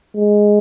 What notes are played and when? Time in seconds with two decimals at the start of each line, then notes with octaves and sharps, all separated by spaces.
0.15 G#3